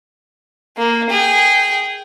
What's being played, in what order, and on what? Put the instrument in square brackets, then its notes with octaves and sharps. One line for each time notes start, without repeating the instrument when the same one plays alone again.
[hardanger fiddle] A#3
G#4 G5